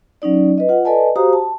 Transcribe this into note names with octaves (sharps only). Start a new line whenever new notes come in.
F#3 C#4 D#4 D5
B4 D#5
F4 F#5
A4 B4 D5 D#5 G#5 A5
F#4 G4 C5 F5 A#5 D#6
A5